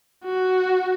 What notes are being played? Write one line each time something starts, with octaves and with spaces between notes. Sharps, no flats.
F#4